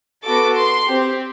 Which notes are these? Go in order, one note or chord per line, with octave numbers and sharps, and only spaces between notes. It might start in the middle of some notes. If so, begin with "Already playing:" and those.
B3 F#4 A4 D6
C6
C4 G4